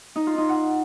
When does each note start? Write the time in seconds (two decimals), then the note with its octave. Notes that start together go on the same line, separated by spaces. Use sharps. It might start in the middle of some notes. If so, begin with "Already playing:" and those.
0.16 D#4
0.27 F4
0.38 D#4
0.49 F#5